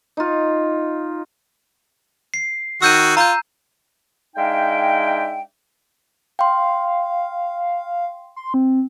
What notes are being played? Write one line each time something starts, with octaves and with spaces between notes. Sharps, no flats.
D#4 F4
C7
D#3 F#4 E6 G6 D#7
F4 A#5 G6
G#3 D4 D#4 E5 F5 G5
F5 G5 C6
C6
C4